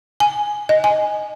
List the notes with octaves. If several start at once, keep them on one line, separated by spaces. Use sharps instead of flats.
G#5
D#5
G#5